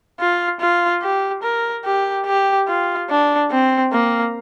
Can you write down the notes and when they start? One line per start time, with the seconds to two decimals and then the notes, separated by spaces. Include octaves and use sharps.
0.20 F4
0.60 F4
1.03 G4
1.43 A#4
1.85 G4
2.26 G4
2.68 F4
3.10 D4
3.51 C4
3.93 A#3